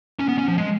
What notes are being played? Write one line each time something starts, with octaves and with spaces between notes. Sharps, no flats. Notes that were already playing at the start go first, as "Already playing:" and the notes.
C#4
B3
C#4
F3
G#3